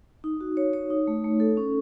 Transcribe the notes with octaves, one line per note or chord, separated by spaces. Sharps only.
D#4
F#4
C#5
C#5
D#4
A3
A3
A4
C#4